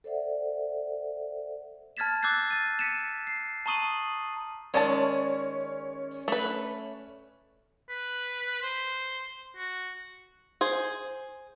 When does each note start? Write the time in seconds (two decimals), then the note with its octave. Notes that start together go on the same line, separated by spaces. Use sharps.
0.04 A4 C5 D5 E5 F#5
1.97 A5 F6 G#6 A6 B6 E7
2.22 D6 E6 F#6 G6 A6 C7
2.50 A6 D#7
2.79 B6 C#7 D#7 E7
3.27 C7
3.66 A5 A#5 C#6 D#6 D#7 F#7
4.74 D#3 G#3 C#4 C#5 D5 A5
6.28 A3 B4
7.89 B4
8.62 C5
9.56 F#4
10.61 G#4 C5